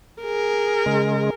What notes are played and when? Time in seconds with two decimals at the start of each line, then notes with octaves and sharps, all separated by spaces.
0.22 G#4 A#4
0.86 C#3 G#3